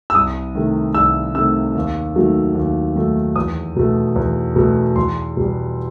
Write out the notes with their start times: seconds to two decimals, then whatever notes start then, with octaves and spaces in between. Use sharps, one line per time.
0.10 E6
0.15 C2 D#6
0.55 C3 D#3 A3
0.94 C2 E6
1.35 C3 D#3 A3 E6
1.75 D#2
2.16 D#3 F#3 A3
2.55 D#2
2.96 D#3 F#3 A3
3.36 E2 D#6
3.76 B2 A3
4.16 E2
4.56 B2 A3
4.96 E2 C6
5.37 B2 G3